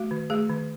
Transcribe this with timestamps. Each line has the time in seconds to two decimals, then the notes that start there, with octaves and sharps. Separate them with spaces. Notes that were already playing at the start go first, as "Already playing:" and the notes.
Already playing: A3 F#4
0.11 D#3
0.30 A3 G#4
0.50 D#3